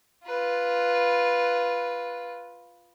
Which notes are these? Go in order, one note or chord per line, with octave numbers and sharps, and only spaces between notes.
F4 B4